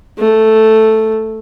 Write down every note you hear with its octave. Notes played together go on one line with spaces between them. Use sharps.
A3